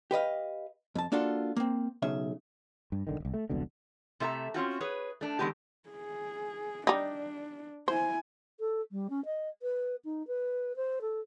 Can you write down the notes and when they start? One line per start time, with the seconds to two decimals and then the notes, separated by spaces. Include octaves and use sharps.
0.11 G4 B4 D#5 F5
0.95 F2 A5
1.12 A#3 D4 F4 F#4 A4
1.57 A#3 C4
2.02 B1 C#3 E5
2.92 G2
3.07 B1 D3 D#3
3.20 D1 C2
3.34 A3
3.50 E1 C2 B2 D3
4.20 C3 A3 E5 A#5
4.54 C4 C#4 F4 F#4
4.80 G#4 B4 C#5
5.21 A3 D4
5.39 D3 D#3 G#3 B3 G4
5.89 G#4
6.87 G3 D4 D#4
7.88 E4 C5 G#5
8.59 A4
8.91 G3
9.09 C#4
9.25 D#5
9.62 B4
10.04 D#4
10.27 B4
10.76 C5
11.01 A4